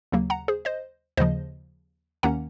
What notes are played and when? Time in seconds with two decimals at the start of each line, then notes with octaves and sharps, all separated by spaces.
0.12 D#2 C#3 F#3 A#3
0.30 F#5 A#5
0.48 G#4 C5
0.65 C5 D#5
1.17 D#2 C#3 F3 C5 D#5
2.23 D#2 D#3 A#3 C#4 F#5 A#5